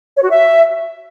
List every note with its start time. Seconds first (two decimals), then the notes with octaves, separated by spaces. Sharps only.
0.15 C#5
0.22 F#4
0.29 E5